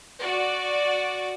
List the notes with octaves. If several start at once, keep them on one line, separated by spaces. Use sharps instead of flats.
F#4 D5